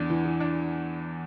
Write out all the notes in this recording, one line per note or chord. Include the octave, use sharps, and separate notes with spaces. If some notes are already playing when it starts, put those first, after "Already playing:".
Already playing: E2 D4
E3
E3
D4